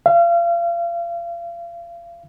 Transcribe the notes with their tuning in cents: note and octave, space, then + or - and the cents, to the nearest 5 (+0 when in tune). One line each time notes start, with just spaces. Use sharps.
F5 -35